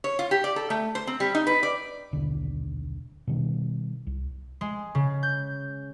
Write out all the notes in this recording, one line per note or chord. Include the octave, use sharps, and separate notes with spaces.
C#5
F4
G4
D5
A4
A3
C5
C4
G3
D#4
B4
D5
D#1 B1 D3 D4
B2 D#3 G3
C2
G#3
C#3
G6